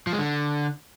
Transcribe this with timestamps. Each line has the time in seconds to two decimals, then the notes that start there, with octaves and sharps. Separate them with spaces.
0.07 F3
0.13 G#3
0.19 D3